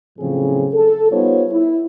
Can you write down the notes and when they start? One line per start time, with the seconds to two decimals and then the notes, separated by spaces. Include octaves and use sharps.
0.19 A2 C#3 F3 F#3 C4 G#4
0.74 A4
1.12 G3 B3 D#4 F4 C5 C#5
1.52 E4